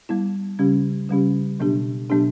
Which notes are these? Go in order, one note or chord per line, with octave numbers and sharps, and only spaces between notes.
G3 B3 E4
C#3 G3 C#4 G4
C#3 G3 C#4 G4
B2 F#3 B3 D4 G4
B2 F#3 B3 D4 G4